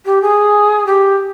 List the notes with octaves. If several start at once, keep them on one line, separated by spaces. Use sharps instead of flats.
G4
G#4
G4